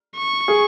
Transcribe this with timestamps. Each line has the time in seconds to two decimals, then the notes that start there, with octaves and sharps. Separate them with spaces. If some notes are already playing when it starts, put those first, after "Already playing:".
0.17 C#6
0.48 G#4